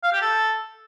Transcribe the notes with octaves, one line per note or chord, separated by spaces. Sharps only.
F5
G4
A4